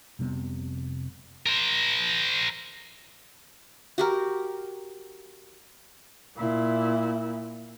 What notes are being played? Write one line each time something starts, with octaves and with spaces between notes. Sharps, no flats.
F1 C3 G3 B3
A#4 C5
F#4 G4 A#4
A#2 E4